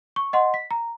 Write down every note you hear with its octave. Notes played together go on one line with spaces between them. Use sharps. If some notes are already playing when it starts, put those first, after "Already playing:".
C#6
D#5 F#5 C6
B6
A#5